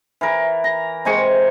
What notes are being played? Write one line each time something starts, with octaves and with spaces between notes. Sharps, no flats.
E3 A#4
A#5
C3 G#3 G#5 C#6